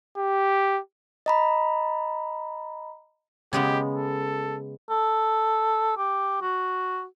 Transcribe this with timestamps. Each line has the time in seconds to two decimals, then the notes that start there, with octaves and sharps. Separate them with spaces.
0.17 G4
1.26 D#5 A#5 B5
3.53 C#3 G#3 B3 G4
3.94 A4
4.90 A4
5.97 G4
6.42 F#4